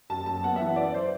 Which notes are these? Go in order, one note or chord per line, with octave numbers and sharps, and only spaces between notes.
F#2 A5
F#2 A5
B3 F#5
E5
E3 F#5
F#2 D5
C5